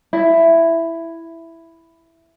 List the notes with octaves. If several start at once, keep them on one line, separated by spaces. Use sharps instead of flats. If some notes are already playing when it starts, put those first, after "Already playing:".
E4 E5